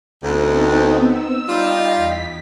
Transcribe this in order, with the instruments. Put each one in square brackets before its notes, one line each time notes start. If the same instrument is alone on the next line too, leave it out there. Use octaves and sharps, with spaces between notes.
[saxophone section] D2 [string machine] B3 C4 D#4
[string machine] E6
[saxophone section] G3 F4 [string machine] D#4 D#5 G5
[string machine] E2 B6